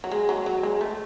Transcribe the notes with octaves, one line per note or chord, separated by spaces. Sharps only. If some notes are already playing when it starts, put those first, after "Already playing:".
F#3
G#3
F#3
F#3
G#3
A3